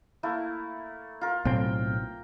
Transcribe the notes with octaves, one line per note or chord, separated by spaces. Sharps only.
A3 A#3 E4
F4 A#4
B1 A2 C4 G5